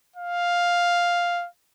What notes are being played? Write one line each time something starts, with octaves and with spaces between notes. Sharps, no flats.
F5